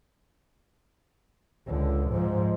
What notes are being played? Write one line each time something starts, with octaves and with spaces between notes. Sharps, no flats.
C#2 D3
G#2 F3